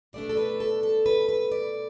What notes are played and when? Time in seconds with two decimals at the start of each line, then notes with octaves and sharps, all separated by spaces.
0.13 B2 A3 D4 D5
0.29 A4
0.37 B4
0.60 A4
0.83 A4
1.06 B4
1.29 B4
1.52 D5